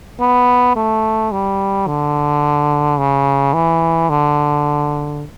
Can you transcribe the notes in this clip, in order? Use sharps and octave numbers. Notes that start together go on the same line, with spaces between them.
B3
A3
G3
D3
C#3
E3
D3